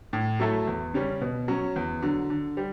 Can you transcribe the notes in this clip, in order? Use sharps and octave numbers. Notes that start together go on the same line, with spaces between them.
A2
F#3 A3 E4 A4
E2
C#3 G3 C#4
B2
F#3 C#4
E2
D3 F#3
D3
G3